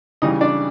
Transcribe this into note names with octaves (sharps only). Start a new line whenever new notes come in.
C#3 E3 G3 D#4 D#5
D4 D5